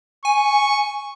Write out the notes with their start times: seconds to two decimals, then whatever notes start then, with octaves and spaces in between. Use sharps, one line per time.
0.25 G#5 C#6